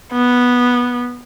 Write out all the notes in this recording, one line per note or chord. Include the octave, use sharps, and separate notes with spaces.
B3